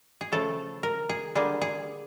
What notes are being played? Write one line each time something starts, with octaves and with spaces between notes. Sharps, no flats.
G#4
C#3 F3 A3 A4
A#4
G#4
D3 G3 A#3 G#4
G#4